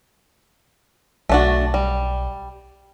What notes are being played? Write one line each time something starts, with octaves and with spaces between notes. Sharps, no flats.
B1 A3 D4 F#4
G3